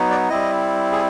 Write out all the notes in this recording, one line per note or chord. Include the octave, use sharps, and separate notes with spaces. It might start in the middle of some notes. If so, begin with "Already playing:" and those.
Already playing: F#3 B3 D#4
D5
G3 C4 E4 D#5
G#4